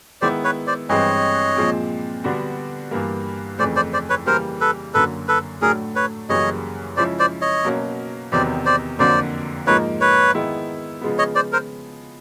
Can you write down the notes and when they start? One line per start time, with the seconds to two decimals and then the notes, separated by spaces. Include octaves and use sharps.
0.21 D#3 G#3 B3 E4 C5 D5
0.44 B4 C#5
0.67 C5 D5
0.89 G2 E3 G#3 C4 C#5 D#5
1.56 A#2 F3 G#3 C4
2.24 D3 G3 B3 D4 F#4
2.91 G2 E3 G3 A#3
3.59 F2 C#3 E3 A3 C5 D5
3.76 C5 D5
3.93 C5 D5
4.10 B4 C#5
4.26 C#3 E3 G3 A#3 A#4 C5
4.61 A4 B4
4.94 F#2 D3 F#3 A#3 A4 B4
5.28 A4 B4
5.61 A2 F#3 A3 D4 G#4 A#4
5.95 B4 C#5
6.29 F#2 C#3 E3 G3 A#3 C#5 D#5
6.97 C#3 F3 G#3 C#4 E4 C5 D5
7.19 C5 D5
7.41 C#5 D#5
7.65 B2 F#3 A#3 C#4
8.32 E2 C3 D#3 F#3 B3 C5 D5
8.65 C5 D5
8.99 F2 D3 F#3 A#3 C5 D5
9.67 G#2 F3 A#3 D#4 B4 C#5
10.01 B4 C#5
10.35 D#3 G#3 B3 E4
11.01 C#3 F3 G#3 B3
11.18 C#5 D#5
11.35 C5 D5
11.53 A#4 C5